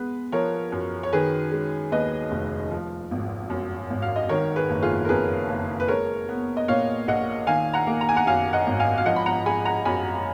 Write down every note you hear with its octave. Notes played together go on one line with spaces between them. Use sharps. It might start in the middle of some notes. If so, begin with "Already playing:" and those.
Already playing: G#3 B3 B4
F3 A#4 C#5
F#2
C#5
D#3 G#4 B4
G#3
D#2 B4 D#5
F1
F3
G#1
F#2
G#1
F5
D#5
D#3 A#4 C#5
G#4 B4
F#1
F4 G#4
A#4
F2 G#4 B4
F#1
B4
G#3 A#4 C#5
B3
D#5
A#2 C#5 F5
A#1 D#5 F#5
D#3 F5 G#5
F#5 A#5
A#3
A#5
G#5
F#5 A#5
F#2 F5 G#5
D#5 F#5
G#1
F5 G#5
F5
F3 D#5 F#5
B5
F#5 A#5
G#3 G#5 B5
F#5 A#5
F#2 G#5 B5